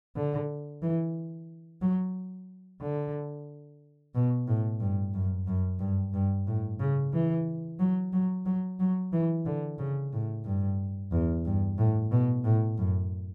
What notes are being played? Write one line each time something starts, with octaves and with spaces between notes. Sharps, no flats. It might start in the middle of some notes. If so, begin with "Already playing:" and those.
D3
E3
F#3
D3
B2
A2
G2
F#2
F#2
G2
G2
A2
C#3
E3
F#3
F#3
F#3
F#3
E3
D3
C#3
A2
G2
E2
G2
A2
B2
A2
F#2